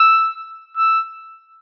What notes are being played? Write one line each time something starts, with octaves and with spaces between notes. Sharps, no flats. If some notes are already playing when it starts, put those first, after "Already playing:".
Already playing: E6
E6